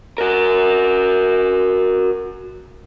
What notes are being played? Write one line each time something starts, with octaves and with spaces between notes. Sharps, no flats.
F#4 A#4